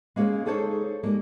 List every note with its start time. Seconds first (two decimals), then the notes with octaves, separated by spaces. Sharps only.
0.16 G#3 A#3 C#4 G#4 C#5
0.45 D#4 G#4 A4 C5 C#5
1.03 G3 G#3 A#3